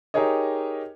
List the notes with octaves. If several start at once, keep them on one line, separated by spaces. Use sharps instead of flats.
D#4 G4 G#4 A#4 C#5 D#5